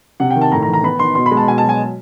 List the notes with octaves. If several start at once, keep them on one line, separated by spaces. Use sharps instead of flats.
C3 F#5
G5
D#3
A5
A2 A#5
A#5
E3
A#5
B3 B5
D#3 C6
B2 C6
B5
G#3
A5
B2 G#5
A5
F#3
G#5